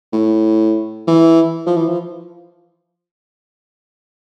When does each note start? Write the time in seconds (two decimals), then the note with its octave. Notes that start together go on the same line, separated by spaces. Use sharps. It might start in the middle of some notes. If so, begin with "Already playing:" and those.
0.13 A2
1.07 E3
1.66 F3
1.77 E3
1.89 F3